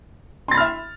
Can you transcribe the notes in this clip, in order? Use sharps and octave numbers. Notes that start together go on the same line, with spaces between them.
E5 B5 C6 F6 A6